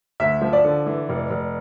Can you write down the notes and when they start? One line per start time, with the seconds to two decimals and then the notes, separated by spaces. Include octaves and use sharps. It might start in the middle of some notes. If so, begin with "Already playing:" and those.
0.20 D2 E5
0.42 F3
0.53 D5
0.64 D3
0.86 E3
1.09 F1
1.30 F1